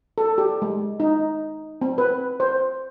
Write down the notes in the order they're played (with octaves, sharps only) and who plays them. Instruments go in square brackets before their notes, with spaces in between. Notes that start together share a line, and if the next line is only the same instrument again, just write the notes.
[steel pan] A4
G4
G#3
D#4
C4
B4
C5